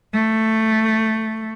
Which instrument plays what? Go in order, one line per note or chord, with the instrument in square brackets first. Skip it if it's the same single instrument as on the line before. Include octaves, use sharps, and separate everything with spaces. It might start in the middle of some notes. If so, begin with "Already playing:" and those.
[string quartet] A3